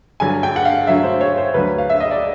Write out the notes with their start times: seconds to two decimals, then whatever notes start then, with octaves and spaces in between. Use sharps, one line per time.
0.20 G2 D3 F#3 G#5
0.43 G5
0.56 F#5
0.65 F5
0.87 G2 D3 F#3 E5
1.04 C5
1.20 C#5
1.37 C5
1.54 D2 D3 F#3 B4
1.78 F5
1.90 E5
2.00 D#5
2.11 D5